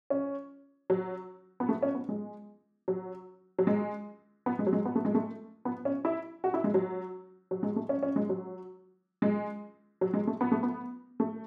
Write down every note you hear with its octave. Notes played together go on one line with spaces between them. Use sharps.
C#4
F#3
B3
A3
C#4
B3
G#3
F#3
F#3
G#3
B3
G#3
F#3
G#3
B3
A3
G#3
A3
B3
C#4
E4
F#4
E4
G#3
F#3
F#3
G#3
A3
C#4
C#4
G#3
F#3
G#3
F#3
G#3
A3
B3
A3
B3
A3